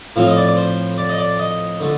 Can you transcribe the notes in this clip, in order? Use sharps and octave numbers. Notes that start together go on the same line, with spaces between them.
A2 F3 C4 F5
D#5
D5
D5
C5
D5
D#5
D5
D#5
D3 A3